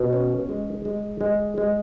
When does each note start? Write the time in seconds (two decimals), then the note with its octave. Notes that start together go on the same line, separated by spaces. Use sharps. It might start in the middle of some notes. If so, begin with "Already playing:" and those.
Already playing: B2
0.13 C#4
0.49 G#3
0.85 G#3
1.21 G#3
1.58 G#3